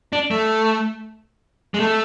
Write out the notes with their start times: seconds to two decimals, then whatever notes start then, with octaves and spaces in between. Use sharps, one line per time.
0.13 D4
0.31 A3
1.74 G#3
1.80 A3